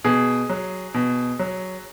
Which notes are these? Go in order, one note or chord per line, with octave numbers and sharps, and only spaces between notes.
B2 G#4
F#3
B2
F#3